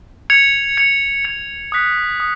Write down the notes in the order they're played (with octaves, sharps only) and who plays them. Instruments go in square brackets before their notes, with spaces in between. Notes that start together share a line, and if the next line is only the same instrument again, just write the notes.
[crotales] G#6 C#7 F7
G#6 C#7 F7
G#6 C#7 F7
D#6 F#6 B6 F7
D#6